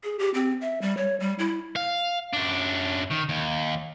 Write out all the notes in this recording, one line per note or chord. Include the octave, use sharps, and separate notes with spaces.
G#4
G4
C4
E5
G3
C#5
G3
E4
F5
F#2 D4
D#3
D#2